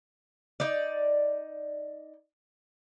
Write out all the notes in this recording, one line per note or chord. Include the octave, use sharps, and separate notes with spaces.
D#4 D5